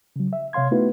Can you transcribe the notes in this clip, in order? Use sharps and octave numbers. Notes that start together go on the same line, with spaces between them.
C#3 F#3
E5
C3 C#5 F5 C6 G#6
A3 B3 D#4 E4 F#4 B4